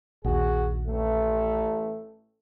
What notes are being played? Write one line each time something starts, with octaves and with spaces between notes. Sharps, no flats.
A#1 D#2 F#4 G#4
A1 A3